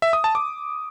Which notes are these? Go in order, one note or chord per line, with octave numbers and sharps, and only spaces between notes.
E5
D#6
A5
D6